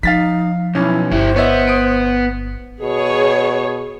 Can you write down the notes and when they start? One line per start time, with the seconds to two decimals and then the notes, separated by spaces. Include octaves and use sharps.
0.03 F3 D#4 F5 A6 B6
0.75 B1 C#4 E4
1.12 G1 E4 G4 C5
1.36 B3 C#5 D#5 E5
1.67 D#6 D7
2.82 B2 G#4 C#5